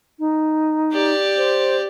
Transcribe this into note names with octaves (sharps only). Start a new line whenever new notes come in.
D#4
G4 D5
C5